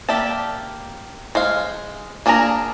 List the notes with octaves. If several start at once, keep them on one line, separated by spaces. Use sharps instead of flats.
A#3 G4 D5 E5 A5
G#3 C5 F5
A#3 D4 G#4 G#5 A#5